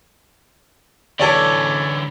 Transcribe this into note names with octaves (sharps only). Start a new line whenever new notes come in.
D3 E3 A4 C#5 D5